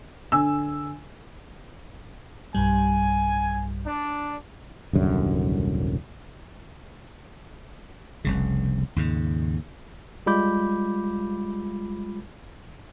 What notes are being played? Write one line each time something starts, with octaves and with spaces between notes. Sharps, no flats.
D3 G#5 E6
B1 G2 G3 G#5
D4
D#1 C2 F#2 D3
F1 C2 C#3
D#2 G#2 C#3
G3 G#3 F4 B5 D6 G6